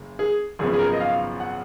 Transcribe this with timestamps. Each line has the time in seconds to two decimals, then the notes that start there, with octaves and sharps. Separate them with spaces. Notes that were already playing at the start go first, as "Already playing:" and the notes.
Already playing: F#1 C#3
0.19 G#4
0.59 G#1 F#2 C#3 F3 B3 G#4
0.73 G#4
0.79 A#4
0.92 D#5
1.00 F5
1.40 F#5